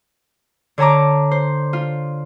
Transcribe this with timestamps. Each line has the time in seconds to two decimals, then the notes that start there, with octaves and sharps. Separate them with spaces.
0.78 D3 C#5 A5 A#5 D6
1.31 C5
1.73 F4